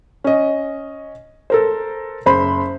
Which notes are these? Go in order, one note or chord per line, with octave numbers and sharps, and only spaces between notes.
C#4 D#5
A4 A#4 C5
F#1 C5 B5 C6